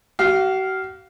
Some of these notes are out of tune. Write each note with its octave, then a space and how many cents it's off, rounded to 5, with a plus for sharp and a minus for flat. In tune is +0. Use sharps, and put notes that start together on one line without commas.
F#4 +45 F5 +0